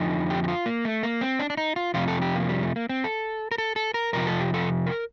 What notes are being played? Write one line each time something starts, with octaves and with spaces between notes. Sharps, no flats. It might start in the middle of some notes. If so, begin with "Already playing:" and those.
Already playing: F2 D3 F3 D#4
G4
G4
F4
A#3
A3
A#3
C4
D4
D4
D#4
F4
F2 C3 F3 F4
A4
G4
A#3
G3
A3
A#3
C4
A4
A#4
A4
A4
A#4
F2 C3 F3 A#4
A4
G4
A4
A#4